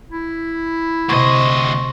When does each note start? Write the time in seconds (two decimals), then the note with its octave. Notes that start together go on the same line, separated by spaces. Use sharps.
0.10 E4
1.09 D2 C3 D#5 C6 C#6